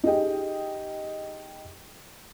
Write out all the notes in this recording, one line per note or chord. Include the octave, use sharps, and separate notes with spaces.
D#4 G4 G#4 D#5 G5